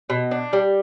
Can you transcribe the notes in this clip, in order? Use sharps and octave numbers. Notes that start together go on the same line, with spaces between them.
B2
D4
G3